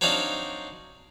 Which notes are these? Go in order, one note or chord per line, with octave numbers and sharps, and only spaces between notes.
F#3 C4 D4 D#4 F5